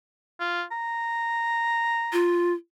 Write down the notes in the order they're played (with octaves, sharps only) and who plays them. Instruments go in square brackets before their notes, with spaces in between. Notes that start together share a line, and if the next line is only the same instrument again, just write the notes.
[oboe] F4
A#5
[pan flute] F4